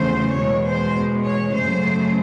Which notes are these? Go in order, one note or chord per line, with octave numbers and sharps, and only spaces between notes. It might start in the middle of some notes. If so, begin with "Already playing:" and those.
Already playing: E2 C#3 F#3 A3 C5
E2 B2 G#3 C#5
C5
C#5
F#2 C#3 F#3 A3 C5